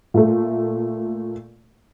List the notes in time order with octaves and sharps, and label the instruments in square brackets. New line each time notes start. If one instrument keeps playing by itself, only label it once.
[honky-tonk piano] A#2 A3